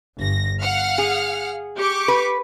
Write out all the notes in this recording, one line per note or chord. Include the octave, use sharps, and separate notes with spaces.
G1 A#6
F5 F#5 F6
G#4
G4 C#6 D6
B4